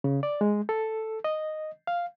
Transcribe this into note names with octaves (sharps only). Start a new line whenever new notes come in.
C#3
D5
G#3
A4
D#5
F5